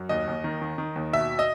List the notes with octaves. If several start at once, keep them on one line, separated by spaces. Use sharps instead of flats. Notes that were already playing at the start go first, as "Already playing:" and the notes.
Already playing: F#2
D#2 D#5
D#2
D#3
D#3
D#3
D#2
B2 E5
D#5